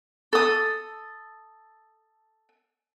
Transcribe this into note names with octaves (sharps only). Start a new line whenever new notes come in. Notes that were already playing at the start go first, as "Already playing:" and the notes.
A4 D#6